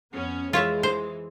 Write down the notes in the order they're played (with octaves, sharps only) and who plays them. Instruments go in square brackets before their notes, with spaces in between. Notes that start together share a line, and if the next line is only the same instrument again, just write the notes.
[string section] F2 B3 C#4
[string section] E3 G#3 [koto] F4 C#5 E5
[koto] C5